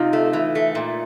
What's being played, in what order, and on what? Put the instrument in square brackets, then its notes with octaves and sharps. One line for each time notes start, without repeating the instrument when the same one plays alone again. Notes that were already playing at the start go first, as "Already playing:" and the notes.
Already playing: [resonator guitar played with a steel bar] C3 [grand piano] D#4 F4
[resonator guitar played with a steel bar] A3
E3
A3
A#2